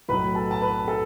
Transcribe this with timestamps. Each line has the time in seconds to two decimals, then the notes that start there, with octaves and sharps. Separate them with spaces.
0.08 B1 A2 F#3 B4 B5
0.35 A4 A5
0.51 A5
0.61 B4 B5
0.88 A4 A5